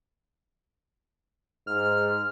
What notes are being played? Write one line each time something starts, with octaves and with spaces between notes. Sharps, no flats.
G#2 F6